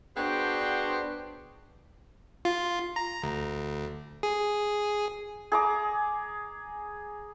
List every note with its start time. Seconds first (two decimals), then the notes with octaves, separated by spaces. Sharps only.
0.17 B3 D4 F#4 G#4 C5 G5
2.45 F4
2.96 A#5
3.23 D2
4.23 G#4
5.52 G#4 A#5 D6